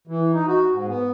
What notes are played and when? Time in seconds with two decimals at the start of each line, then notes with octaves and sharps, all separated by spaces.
0.07 E3
0.33 D#4
0.47 F#4
0.72 G#2
0.87 B3